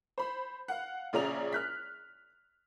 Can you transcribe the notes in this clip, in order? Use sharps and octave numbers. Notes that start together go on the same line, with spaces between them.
C5 B5
F5 F#5
A#1 C#3 F4 D5 A#5 F7
F6 F#6 B6